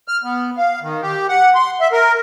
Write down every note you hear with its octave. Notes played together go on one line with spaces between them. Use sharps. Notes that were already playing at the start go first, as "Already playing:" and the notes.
F6
B3
F5
D#3
G4
F#5
C6
E5
A#4